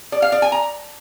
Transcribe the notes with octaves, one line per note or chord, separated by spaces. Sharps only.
D5
F5
D5
G#5
A#5